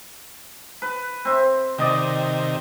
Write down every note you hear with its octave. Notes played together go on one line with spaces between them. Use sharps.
B4
C4 E5
C3 D#3 D5 D#5 G5